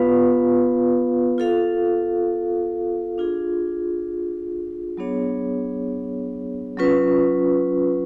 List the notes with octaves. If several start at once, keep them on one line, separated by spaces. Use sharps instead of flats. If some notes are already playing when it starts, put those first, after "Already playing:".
Already playing: B3 F4 B4 F5
F4 A4 F5
D4 F4 G#4
F#3 B3 D4 G#4 C#5
F#3 C#4 F4 B4